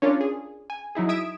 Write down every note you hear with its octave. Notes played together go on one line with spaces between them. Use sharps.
C#4 D4 F4 A#4 C#5 D5
G#4
G#5
F#3 D#4 E4 G#4
E5 D#6 G#6 B6 D7 E7